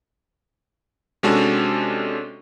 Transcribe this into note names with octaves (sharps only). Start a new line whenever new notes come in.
C3 G#3 C#4 D4 F#4 A4